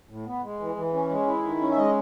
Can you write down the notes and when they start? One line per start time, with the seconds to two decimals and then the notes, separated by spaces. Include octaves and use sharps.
0.09 A2
0.26 B3
0.43 G#3
0.59 E3
0.75 E3
0.93 C#4
1.10 G#3
1.27 E4
1.43 D#3
1.60 C#4
1.71 E5
1.77 G#3 D#5